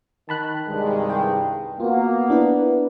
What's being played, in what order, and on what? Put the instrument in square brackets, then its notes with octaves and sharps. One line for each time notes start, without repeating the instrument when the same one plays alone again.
[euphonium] D#3 [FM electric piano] A5 B5 F#6
[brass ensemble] C2 D#3 G#3 [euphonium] G2
[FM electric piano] G5
[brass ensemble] A#3 [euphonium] B3 [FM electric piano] F4 F#4
[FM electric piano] D4 E4 B4